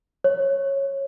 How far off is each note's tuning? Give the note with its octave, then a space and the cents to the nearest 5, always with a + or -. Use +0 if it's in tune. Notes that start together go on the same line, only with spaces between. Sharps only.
C#5 -15